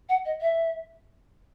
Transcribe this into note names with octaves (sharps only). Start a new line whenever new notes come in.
F#5
D#5
E5